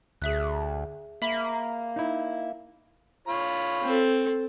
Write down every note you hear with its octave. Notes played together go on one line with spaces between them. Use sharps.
D2 G#4 E5 F#6
A#3 E5 B5 B6
D#4 E4
F4 C#5 B5
C4 A4